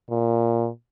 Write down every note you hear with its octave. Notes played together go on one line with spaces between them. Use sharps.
A#2